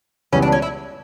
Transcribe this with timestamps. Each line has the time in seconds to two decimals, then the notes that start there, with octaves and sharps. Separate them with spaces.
0.33 C#2 C#3 E3 G3 B3 C#4
0.42 D4
0.52 C#4
0.62 E4